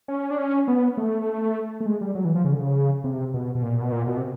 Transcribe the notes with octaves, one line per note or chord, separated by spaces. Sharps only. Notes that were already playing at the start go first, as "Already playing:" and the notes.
C#4
D4
C#4
B3
A3
A3
G#3
G3
F#3
E3
F3
C#3
D3
C#3
C3
B2
B2
A#2
B2
A#2
B2
C3